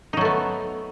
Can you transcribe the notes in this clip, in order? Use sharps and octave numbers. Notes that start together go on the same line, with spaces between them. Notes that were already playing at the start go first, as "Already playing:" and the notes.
F#3 A3 B3 D#4